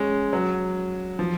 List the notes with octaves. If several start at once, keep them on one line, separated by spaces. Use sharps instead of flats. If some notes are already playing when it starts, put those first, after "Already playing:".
Already playing: G#3 C#4
F#3
F3